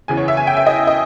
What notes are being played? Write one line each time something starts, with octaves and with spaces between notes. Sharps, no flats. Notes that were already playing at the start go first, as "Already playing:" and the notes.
E2 C#3 E3 G#5
C#5
E5
G#5
G5
E5
D#5
D#5